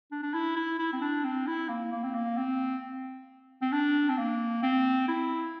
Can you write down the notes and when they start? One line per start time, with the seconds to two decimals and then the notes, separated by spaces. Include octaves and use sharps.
0.11 D4
0.23 D4
0.34 E4
0.56 E4
0.79 E4
0.93 C4
1.01 D4
1.24 C4
1.47 E4
1.69 A#3
1.92 A#3
2.04 C4
2.15 A#3
2.38 C4
3.62 C4
3.72 D4
4.09 C4
4.18 A#3
4.63 C4
5.08 E4